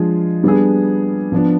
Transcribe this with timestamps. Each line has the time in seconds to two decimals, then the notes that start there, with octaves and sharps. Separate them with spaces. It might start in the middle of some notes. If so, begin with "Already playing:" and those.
Already playing: F3 G#3 D4 F4 G#4
0.44 G3 B3 D4 G#4
1.32 F3 B3 D4